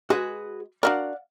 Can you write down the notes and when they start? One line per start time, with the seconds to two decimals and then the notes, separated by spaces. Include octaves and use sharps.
0.10 G#3 F#4 G#4 B4
0.83 D4 F#4 A#4 D5 F5 F#5